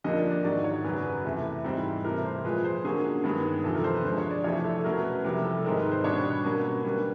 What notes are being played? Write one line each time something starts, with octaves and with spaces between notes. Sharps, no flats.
F2 D3 F3 A#3 D4 D#5
D5
D5
G#2 D#3 F#3 D5
C#5
F#2 C#3 F#3 B4
B4
E2 C3 E3 A3
G#2 E3 G3 C4
C3 E3 A3 A#4
C5
A#2 F3 G#3 B4
C5
D3 F#3 A#3 C#4 G#4
G2 D#3 G#3 B3
E2 C3 F3 A4
A#4
C5
B4
D3 F3 G#3 C5
C#5
D5
F2 C3 E3 A3 C4 C#5
A4
B2 F#3 A3 C#4 A#4
B4
B4
F2 C3 E3 G3 A#4
A4
G#2 D#3 G#3 C4 A#4
B4
C5
B2 G3 B3 D4 C#5
B2 F#3 A#3 C#4
D3 G3 A#3 B4